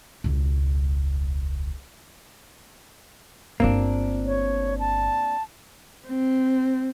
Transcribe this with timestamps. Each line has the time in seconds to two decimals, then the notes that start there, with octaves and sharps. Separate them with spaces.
0.24 E1 C#2
3.60 G1 A#3 C4 D4 F4
4.26 C#5
4.79 A5
6.07 C4